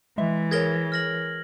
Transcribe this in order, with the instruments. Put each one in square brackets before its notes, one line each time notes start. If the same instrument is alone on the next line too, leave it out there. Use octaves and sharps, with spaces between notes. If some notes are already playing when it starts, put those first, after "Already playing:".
[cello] E3 [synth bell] G#3 E5
[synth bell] G#4 A#4 C#5 [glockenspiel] G#6 A#6 G7
[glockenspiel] F6 A#6 F#7